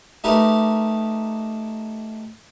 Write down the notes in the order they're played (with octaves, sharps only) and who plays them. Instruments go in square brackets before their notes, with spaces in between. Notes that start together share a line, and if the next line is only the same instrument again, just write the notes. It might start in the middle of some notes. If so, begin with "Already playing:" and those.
[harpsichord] A3 D#4 G4 A#4 B4